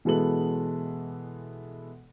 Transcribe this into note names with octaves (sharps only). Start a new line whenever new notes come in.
B2 E3 G#3 B3 A4 F#7